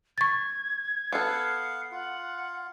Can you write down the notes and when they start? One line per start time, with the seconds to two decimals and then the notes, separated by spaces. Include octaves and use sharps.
0.18 C#6 G#6 A6
1.13 B3 A4 F5 F#5
1.92 F4 F#5